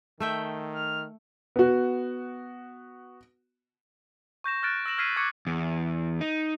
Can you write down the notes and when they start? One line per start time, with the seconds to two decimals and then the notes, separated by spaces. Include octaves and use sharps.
0.20 D#3 A3 E5 G5
0.75 F6
1.56 B3 F#4
4.44 C#6 G6 A#6 E7
4.63 F6 F#6 A6 D7
4.86 E6 A#6 E7 F#7
4.98 F6 G#6 B6 C7 D#7
5.16 C#6 D6 F#6 G#6 C#7
5.47 E2
6.21 D#4